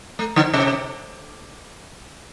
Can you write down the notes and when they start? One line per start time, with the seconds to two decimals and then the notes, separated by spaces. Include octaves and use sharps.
0.19 A3
0.36 D3
0.53 C3